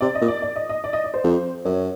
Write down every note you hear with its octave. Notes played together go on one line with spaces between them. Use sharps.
C3 D5
D#5
A#2
D5
D5
D#5
D#5
D5
D#5
D5
C5
F2
F#2 C#5